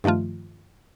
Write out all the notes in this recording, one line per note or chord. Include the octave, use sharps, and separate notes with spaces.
G2 D#3 F3 A3 F4